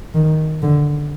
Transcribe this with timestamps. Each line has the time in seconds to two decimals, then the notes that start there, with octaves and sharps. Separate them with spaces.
0.15 D#3
0.62 D3